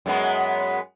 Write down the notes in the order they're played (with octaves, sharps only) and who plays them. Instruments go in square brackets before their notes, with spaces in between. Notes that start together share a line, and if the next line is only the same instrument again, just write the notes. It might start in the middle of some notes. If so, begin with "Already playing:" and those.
[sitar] F#2 G#3 B3